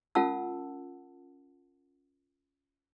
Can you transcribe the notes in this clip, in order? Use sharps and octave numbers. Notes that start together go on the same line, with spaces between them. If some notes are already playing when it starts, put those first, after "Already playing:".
C#4 F4 A#4 F#5 A5 E6